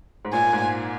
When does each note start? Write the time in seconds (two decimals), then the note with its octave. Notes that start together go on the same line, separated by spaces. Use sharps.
0.25 G#2
0.33 A#2 G#5
0.53 G#2